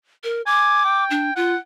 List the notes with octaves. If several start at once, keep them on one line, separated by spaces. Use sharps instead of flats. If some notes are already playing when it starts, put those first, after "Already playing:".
A#4
G#5 D6
G5
D4
F4 F#5